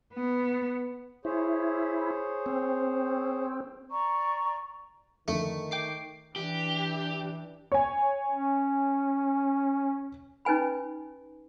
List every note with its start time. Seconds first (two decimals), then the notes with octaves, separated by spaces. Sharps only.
0.14 B3
1.25 E4 G#4 C5 C#5
2.46 C4
3.90 D5 A#5 C#6
5.28 F2 D3 D#3 A3 C#7
5.71 G5 D6 C7
6.36 E3 D4 G4
7.72 C#5 G#5
8.30 C#4
10.45 C#4 D#4 B4 G#5 B5